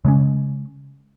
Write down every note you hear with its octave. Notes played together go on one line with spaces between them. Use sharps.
C#3 G#3 C#4